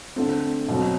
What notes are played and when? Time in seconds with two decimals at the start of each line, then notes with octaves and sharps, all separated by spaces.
0.16 D3 A3 C4
0.68 B2 F#3 C4